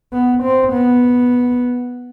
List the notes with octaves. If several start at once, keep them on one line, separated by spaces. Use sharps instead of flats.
B3
C4
B3